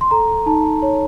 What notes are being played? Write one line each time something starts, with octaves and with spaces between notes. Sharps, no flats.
C6
A4 A#5
D#4 A5
C#5